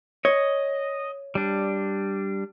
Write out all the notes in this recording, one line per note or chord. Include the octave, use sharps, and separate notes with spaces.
C#5 D#5
G3 D4